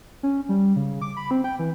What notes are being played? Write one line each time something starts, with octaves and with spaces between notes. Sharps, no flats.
C#4
G3
C#3
D6
B5
C4
G5
E3